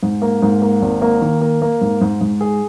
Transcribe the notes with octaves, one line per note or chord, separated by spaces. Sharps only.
G#2
A#3
G#2
A#3
G#1
A#3
D#3
A#3
A#3
G#2
G#2
G#2
G#4